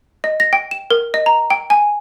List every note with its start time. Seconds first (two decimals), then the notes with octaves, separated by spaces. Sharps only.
0.24 D#5
0.40 A#6
0.53 G5
0.71 E7
0.90 A#4
1.14 D#5
1.26 A#5
1.50 G5
1.70 G#5